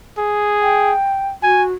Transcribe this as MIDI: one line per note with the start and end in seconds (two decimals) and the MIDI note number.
0.18 0.93 68
0.62 1.29 79
1.43 1.73 66
1.43 1.63 80